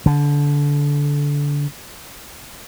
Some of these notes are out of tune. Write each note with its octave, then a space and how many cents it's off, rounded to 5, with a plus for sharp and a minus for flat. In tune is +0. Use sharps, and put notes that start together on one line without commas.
D3 -20